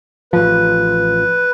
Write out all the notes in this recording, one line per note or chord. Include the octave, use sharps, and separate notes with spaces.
A1 F3 B4